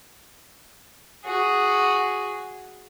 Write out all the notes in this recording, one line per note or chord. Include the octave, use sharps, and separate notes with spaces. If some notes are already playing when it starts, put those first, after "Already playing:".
F#4 G#4